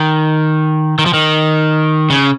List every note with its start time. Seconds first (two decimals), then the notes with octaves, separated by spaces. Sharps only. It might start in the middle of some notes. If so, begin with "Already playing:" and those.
Already playing: D#3
0.99 D#3
1.06 F3
1.14 D#3
2.10 C#3